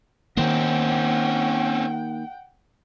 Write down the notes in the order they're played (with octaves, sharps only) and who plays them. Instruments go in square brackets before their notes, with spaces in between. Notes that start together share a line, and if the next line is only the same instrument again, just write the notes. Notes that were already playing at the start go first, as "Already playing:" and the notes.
[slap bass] D#3 A#3 [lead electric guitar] C4 C#4 [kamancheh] F#5 G5